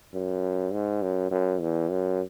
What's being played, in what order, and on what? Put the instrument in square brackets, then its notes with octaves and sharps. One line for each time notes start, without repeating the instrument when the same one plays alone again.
[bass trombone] F#2
G#2
F#2
F#2
E2
F#2